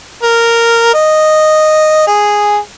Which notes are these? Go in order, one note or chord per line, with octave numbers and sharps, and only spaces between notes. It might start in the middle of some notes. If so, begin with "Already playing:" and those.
A#4
D#5
G#4